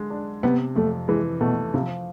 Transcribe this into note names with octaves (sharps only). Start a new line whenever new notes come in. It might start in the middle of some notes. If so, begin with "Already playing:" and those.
Already playing: D3 G#3
D4
C3 B3
F2 A3
E3 G#3
B2 A3
C3 F3